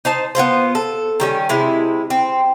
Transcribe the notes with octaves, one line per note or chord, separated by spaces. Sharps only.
D#4 C5 A5
B3 C4 F4 C5
A4
D#3 G3 C#4
C3 G#3 E4
C4